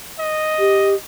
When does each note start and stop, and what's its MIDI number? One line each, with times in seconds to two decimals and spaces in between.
0.19 0.98 75
0.59 0.94 67